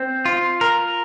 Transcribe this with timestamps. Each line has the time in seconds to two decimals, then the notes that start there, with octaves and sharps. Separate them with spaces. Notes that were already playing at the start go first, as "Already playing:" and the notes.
Already playing: C4
0.25 F4
0.61 A#4